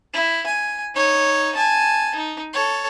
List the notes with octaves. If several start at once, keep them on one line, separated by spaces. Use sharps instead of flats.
E4
G#5
D#4 C#5
G#5 A5
D#4
A4 C#5